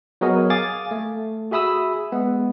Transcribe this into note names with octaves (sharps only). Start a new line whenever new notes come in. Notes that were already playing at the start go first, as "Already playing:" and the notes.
F#3 B3 F#4 G#4 A#4 D#5
F5 G#5 D6 D#6 A6
A3
F#4 G#4 E5 B5 D#6 E6
G#3 B3